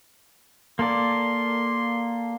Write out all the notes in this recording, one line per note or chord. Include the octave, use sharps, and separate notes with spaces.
A#3 A4 D5 C6